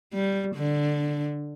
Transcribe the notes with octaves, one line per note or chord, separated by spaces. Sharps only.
G3
D3